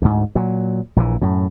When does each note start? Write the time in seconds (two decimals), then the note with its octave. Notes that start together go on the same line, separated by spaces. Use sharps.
0.02 D2 G#2
0.35 A#2 F#3
0.96 A#1 A#2 D3 E3
1.21 F#2 A2